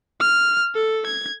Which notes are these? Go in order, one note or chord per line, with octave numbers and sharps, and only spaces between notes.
F6
A4
G#6